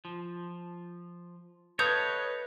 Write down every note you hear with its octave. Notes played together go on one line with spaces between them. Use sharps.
F3
A4 B4 C#5 D#5 F5 D#6 G6 G#6